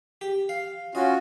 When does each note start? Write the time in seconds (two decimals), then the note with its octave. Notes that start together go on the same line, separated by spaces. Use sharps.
0.21 G4
0.49 F5
0.95 C#4 F4 F#4 D#5